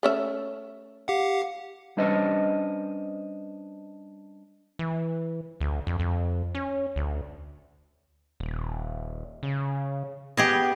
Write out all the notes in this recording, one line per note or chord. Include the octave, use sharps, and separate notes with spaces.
A3 C#4 E5
G4 F5 F#5
G3 C#4 D4 B4 C5 D#5
E3
D2
F2
F2
C#4
D2
D#1
C#3
B3 G4 G#4 D#5